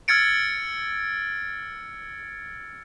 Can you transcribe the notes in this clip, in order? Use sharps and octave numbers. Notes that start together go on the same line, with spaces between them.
E6 F6 G#6 A6 C#7 D7